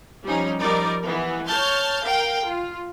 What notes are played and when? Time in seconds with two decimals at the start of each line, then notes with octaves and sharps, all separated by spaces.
0.25 F3 G3 C#4 D#4
0.61 F3 G3 D#4 A#4 D5
1.03 E3 B3
1.46 C#5 A5 F6 G6 A6
2.03 A#4 F5 G5
2.44 F4